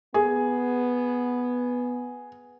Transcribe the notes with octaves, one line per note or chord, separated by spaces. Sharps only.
B3 G#4